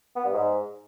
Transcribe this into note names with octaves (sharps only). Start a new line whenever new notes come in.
B3
G2
G#2